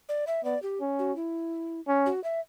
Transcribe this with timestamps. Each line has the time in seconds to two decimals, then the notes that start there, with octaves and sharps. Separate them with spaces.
0.09 D5
0.27 E5
0.44 B3 D5
0.63 G4
0.81 C#4
0.99 F#4
1.16 E4
1.88 C#4
2.06 F#4
2.24 E5